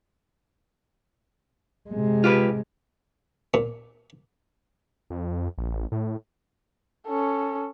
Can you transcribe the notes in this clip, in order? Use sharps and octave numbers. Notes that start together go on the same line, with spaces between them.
C3 G#3
F4 G4 B4
A#2
F2
A#1
A1
A2
C#4 A4